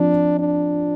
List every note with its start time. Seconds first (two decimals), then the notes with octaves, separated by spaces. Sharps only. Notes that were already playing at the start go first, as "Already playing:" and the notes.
Already playing: F3 C4 D4 F4
0.39 D4